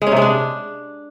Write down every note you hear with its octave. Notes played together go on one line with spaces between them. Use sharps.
G#3
C#4
C3
G#3
D4